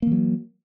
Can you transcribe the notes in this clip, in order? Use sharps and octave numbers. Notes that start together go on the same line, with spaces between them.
E3 F#3 A#3